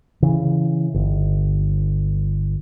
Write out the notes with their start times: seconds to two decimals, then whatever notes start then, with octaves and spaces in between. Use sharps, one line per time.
0.22 C#3 E3
0.94 G1